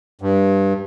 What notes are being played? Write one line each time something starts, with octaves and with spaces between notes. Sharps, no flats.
G2